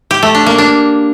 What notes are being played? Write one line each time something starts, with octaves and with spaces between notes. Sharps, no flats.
G4
A3
D4
A#3
D4